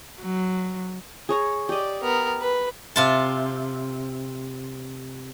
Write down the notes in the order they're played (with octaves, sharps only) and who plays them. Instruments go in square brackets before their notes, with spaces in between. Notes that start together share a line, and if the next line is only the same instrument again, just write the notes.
[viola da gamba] F#3
[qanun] G#4 C#5 A#5
[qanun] G4 D#5 [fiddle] D5
[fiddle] B3 A#4
B4
[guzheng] C3 F4 A5